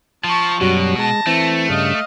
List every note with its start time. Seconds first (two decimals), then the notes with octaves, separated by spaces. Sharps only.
0.24 F3 A5 C#6
0.61 F#2 B2 F#3 G3 F#4
0.98 G#3 A5 A#6
1.27 E3 A3 C4
1.69 G2 C#3 D#5 F5